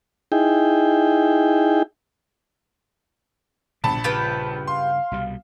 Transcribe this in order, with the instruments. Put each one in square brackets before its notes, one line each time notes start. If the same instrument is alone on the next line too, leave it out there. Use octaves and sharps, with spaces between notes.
[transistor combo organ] D#4 E4 G#4 G5
[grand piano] A#1 A5 B5 [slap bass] B2 D3 G3
[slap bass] G2 C#3 [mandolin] F4 G4 B4
[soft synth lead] F5 [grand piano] C6
[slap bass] C2 B2 G3